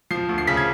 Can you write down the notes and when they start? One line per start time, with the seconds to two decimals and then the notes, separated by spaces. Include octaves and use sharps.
0.11 F3 C7
0.29 D2
0.38 C7
0.47 C#3 B6
0.57 G#6